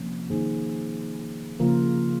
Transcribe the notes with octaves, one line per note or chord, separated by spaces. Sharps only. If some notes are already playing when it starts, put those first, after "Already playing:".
Already playing: C3 F3 A#3 C#4
D#3 A#3 D#4 G#4 C5
C#3 F3 A#3 F4 A#4